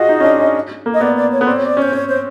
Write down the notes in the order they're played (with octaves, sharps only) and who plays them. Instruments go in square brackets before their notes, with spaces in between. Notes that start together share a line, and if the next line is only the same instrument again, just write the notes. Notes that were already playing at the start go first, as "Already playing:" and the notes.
Already playing: [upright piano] F4 F#4 G#4 [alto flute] D#5
[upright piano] D#4
C#4
D4
C#4
A#3
[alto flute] D#5
[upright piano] B3 [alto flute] D5
[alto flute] D5
C#5
[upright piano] B3
[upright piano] C4 [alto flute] D5
[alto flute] C#5
D5
[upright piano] C#4 [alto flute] C5
[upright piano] C#4 [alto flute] C#5
[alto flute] C5